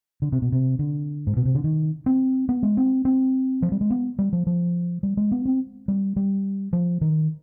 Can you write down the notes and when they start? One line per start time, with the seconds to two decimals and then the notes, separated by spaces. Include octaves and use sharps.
0.22 D3
0.32 C3
0.42 B2
0.52 C3
0.79 D3
1.27 G#2
1.37 B2
1.45 C3
1.55 D3
1.64 D#3
2.06 C4
2.49 B3
2.63 G#3
2.77 C4
3.05 C4
3.62 F3
3.72 G3
3.81 G#3
3.90 B3
4.19 G3
4.33 F3
4.47 F3
5.03 G3
5.17 G#3
5.32 B3
5.45 C4
5.88 G3
6.16 G3
6.73 F3
7.01 D#3